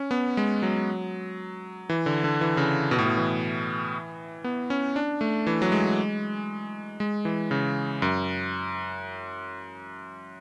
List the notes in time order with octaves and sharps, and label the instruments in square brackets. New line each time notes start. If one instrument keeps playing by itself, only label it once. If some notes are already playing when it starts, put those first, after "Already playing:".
Already playing: [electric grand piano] C#4
B3
G#3
F#3
E3
D3
D3
E3
C#3
B2
A2
B2
E3
B3
C#4
D4
A3
E3
F#3
G#3
G#3
E3
C#3
F#2